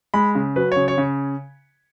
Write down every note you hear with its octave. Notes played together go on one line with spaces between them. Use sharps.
G#3 B5
C#3
F#3 B4
C#3 C#5
C#5
C#3